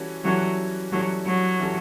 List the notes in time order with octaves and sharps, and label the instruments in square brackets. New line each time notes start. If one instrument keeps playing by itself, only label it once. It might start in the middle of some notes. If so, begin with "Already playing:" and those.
Already playing: [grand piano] E3 G3 C#4 F#4 A4
[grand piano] E3 G3 C#4 F#4 A4 [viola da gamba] F#3
[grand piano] E3 G3 C#4 F#4 A4 [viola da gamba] F#3
[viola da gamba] F#3
[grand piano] E3 G3 C#4 F#4 A4